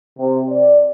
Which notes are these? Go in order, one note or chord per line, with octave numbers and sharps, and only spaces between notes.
C3
D5